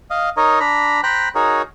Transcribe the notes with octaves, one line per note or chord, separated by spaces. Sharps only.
D#5 F5
D#4 A#4 C#5 D#5
D4 A#5 B5
C5 G5 A#5 B5 F#6
D#4 F#4 G#4 A#4 C#5